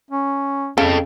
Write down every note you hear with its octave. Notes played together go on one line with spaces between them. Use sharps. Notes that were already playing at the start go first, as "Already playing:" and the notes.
C#4
F2 C#3 A4 G5